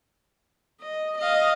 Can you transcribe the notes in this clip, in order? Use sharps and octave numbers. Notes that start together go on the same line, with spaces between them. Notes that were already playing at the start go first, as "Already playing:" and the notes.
D#5
D#5 F5